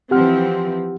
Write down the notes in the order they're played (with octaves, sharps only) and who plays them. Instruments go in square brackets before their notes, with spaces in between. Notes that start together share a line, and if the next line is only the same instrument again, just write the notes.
[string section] E3 F3 C4 [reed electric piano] G4 F#5 F6